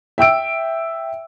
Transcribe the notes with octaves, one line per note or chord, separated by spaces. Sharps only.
E5 G5 E6 D7